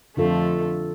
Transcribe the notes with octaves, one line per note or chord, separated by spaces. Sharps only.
F2 D3 A3 F4 A4